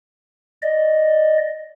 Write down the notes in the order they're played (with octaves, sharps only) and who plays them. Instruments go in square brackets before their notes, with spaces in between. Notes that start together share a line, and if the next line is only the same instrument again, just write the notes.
[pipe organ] D5 D#5